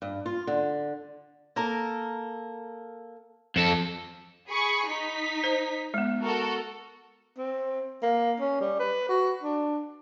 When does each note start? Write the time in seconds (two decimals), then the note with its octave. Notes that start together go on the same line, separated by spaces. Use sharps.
0.02 G2
0.26 F4
0.47 D3
1.56 A#3 A4 A#4
3.56 F2 A4
4.49 G#4 B5 C#6
4.87 D#4 B6
5.44 C5
5.94 G#3 B3
6.23 F#4 A4 A#4
7.38 C4
8.03 A#3
8.40 C#4
8.61 G3
8.79 B4
9.09 F#4
9.43 D4